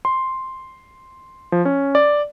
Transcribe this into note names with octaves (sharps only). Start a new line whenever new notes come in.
C6
F3
C#4
D5